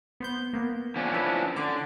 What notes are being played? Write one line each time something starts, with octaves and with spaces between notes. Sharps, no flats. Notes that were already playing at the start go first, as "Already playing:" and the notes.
B3 C5 G6
A#3 B3
F3 C#4 D4
E4 B4 E5
D3 D6